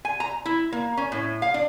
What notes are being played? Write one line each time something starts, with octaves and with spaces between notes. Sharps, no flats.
G#5
A#5
E4
A#3
C#4
A2
F5
D4